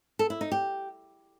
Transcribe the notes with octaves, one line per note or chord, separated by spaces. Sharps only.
A4
E4
D#4
G4